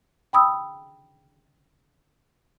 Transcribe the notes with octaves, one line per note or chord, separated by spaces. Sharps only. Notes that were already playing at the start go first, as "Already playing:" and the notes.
G5 B5 D#6 E6